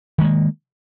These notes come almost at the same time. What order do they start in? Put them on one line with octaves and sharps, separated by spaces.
D#3 G#3 A#3